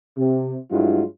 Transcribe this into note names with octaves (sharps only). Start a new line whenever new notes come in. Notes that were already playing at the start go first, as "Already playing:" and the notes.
C3
G2 F#3 G#3 E4 F4